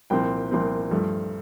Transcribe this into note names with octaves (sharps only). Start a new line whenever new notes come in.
C2 A#2 F3 C4 G5
C2 A#2 F3 C4
G2 F3 A3